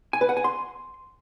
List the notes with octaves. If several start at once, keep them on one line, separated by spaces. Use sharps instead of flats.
G#5
B4
F#5
G#5
C6